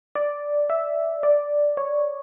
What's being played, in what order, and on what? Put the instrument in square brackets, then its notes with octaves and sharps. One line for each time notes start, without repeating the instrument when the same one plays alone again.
[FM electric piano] D5
E5
D5
C#5